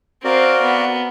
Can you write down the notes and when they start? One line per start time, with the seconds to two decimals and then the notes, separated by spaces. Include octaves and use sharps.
0.24 C4 F#4 A#4 D5 F5
0.62 B3